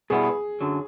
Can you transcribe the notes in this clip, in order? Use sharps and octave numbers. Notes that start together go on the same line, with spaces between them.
B2 G3 B3 E4 G#4
F#2 D3 F#3